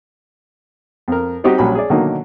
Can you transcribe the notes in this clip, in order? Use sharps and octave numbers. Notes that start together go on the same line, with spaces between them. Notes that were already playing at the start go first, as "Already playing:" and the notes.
F2 A#4
G3 C4 D#4 F#4 G4
A#1 F#3 G3 C#4 G#5 B5
G#4 C#5 D5
B2 D3 D#3 F#3 A#3 D#4